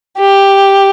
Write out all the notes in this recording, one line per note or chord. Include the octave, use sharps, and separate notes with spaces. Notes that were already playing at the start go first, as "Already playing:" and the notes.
G4